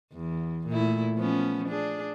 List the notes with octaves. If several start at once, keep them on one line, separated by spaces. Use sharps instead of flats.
E2
A#2 A3 E4
F3 B3 C#4
D4 G#4